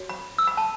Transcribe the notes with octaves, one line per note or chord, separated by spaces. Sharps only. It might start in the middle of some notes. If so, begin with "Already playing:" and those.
Already playing: F#4 C#5
B5
E6
B5
A5